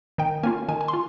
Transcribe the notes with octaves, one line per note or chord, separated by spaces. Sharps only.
D#3 G5
A#3 C#4 F4 G#5
D#3 G#5
G#5
C6
F4